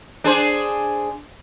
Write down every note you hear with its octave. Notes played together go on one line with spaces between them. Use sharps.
D4 G#4 C5